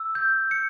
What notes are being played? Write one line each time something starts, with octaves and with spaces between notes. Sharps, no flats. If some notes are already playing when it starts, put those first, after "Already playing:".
Already playing: E6
G6
C#7